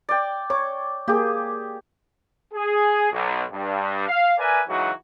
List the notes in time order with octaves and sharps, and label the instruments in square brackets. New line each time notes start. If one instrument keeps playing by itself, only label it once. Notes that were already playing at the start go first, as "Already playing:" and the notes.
[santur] D5 G5
[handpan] C#5 [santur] D6
[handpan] A#3 G#4 [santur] G4
[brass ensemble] G#4
B1
G2
F5
A#4 B4 D5 E5 G#5
C#3 E3 F#3 G#3 D#4 F#4